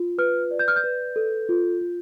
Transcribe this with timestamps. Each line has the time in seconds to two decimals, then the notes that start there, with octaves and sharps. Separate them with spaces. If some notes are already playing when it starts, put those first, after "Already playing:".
Already playing: F4
0.18 B4 F6
0.51 D5
0.59 G6
0.68 F6
0.76 G6
0.84 B4
1.16 A4
1.49 F4
1.81 F4